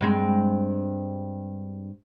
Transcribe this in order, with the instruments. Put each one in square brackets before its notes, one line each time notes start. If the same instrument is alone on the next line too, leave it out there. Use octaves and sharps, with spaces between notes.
[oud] G2 G#3 C4